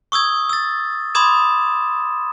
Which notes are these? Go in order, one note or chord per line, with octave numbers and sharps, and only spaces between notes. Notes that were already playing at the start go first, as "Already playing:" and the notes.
C#6 D#6 E6 G#6
E6 A6
B5 C6 D6 D#6 G#6 E7